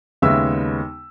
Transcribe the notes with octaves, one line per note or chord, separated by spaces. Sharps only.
D#2 C#3 G#3 B3 E5 E6